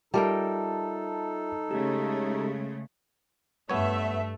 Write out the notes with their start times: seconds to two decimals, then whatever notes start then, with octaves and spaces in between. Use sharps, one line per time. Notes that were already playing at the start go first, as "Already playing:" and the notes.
0.14 G3 D#4 F4 A4 A#4 E5 G5 A5
1.71 C#3 G#3 A3 G4
3.70 G2 A3 B3 C#5 E5